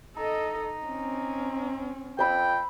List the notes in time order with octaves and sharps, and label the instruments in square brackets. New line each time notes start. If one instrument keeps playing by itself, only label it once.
[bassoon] D#4 [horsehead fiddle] A4 D#5
[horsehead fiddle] C4 C#4
[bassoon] F2 [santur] C5 B5 E6 [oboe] G5